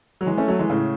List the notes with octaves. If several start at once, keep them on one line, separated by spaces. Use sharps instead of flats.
F#3
E3 G#3
A3 C#4
F#3 A3
E3 G#3
A2 C#3